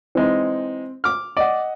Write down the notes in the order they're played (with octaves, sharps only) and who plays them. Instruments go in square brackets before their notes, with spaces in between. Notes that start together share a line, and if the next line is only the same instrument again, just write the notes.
[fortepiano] E3 G#3 D#4 [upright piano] C4
[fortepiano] D6 F6
[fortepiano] D5 [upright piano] D#5 F#5